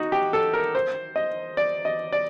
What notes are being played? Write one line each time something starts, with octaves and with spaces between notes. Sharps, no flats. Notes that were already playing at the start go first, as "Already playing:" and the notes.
Already playing: D#4 F#4
G4
A4
A#4
C5
D#5
D5
D#5
D5